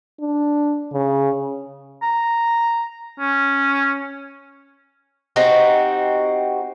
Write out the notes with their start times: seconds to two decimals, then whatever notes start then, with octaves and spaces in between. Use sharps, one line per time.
0.20 D4
0.93 C#3
2.03 A#5
3.19 C#4
5.36 C4 D#4 F#4 G4